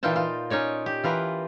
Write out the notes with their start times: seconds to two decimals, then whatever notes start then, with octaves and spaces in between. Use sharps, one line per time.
0.03 A#2 E3 D#4 F4 G5 A5
0.16 F4
0.50 C#4 D#4 C#5 D5
0.86 G4
1.04 E3 F4 A#4 B4